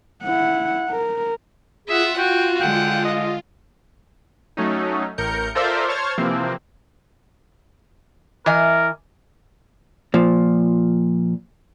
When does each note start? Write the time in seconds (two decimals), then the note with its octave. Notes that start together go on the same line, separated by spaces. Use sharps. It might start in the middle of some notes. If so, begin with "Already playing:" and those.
0.23 E4 F#5
0.90 A#4
1.88 F4 G#4 E5 F#5
2.18 F#4 G5
2.60 D3 G#3 F#5 G5
3.05 D#5
4.57 F#3 A3 C#4 D#4
5.18 A1 A2 A#4 G6 C#7
5.55 F4 A4 A#4 C5 D5 E5
5.87 C5 C#5 A5 F6 G#6
6.18 C3 E3 F3 A#3 C4
8.46 E3 A#4 D#5 G#5
10.14 A#2 F3